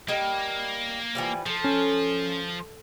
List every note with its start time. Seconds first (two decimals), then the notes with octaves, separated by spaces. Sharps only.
0.08 G3 A#3 D#5
1.15 E3 F3 G3
1.46 F3 A4
1.64 C#4